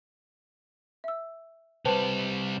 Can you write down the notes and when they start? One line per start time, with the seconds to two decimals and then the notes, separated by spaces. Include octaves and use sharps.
1.04 E5 E6
1.85 C3 G3 B4 C5 A5